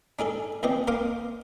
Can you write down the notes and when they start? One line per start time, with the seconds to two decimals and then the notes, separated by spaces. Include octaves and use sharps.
0.19 D4 D#4 G#4 A4
0.63 D#2 E3 C4 D5 D#5
0.88 A#3 F5 A#5 C6 D6 D#6